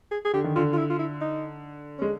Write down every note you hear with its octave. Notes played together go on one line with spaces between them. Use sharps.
G#4
G#4
D3 G4
D#3
D3 F4
F4
E4
F4
E4
D#4
G#3 C#4